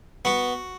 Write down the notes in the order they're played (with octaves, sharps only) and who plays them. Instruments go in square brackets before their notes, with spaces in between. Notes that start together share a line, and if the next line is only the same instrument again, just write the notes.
[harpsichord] B3 F#4